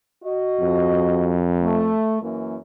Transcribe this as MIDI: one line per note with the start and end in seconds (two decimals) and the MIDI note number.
0.24 1.42 66
0.24 1.42 75
0.60 1.98 41
1.62 2.21 57
2.22 2.56 42
2.22 2.56 52
2.22 2.56 58